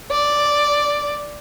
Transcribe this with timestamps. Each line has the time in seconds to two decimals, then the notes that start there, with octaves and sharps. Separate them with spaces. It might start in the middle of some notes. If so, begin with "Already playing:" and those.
0.11 D5